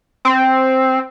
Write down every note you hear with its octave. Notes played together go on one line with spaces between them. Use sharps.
C4